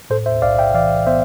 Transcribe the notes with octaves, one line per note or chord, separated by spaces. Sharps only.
A2 A4 C5
C5 E5
B1 D5 F5
E5 G5
E3 D5 F5
B3 C5 E5